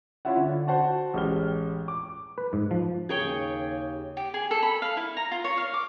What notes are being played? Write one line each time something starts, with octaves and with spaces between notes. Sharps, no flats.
C#4 E4 F4 E5 F#5
D3
F#4 C5 F#5 A5 C#6
A1 G#3 G4 F6 G7
D6
B4
G#2
F3
D#2 C#3 G#4 C#5 G5
G4
G#4
A4
B5
F5
E4
A#5
F4
C#5
F5
D6